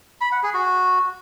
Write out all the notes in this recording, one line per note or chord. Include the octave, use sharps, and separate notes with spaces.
B5
F#5
G#4
F#4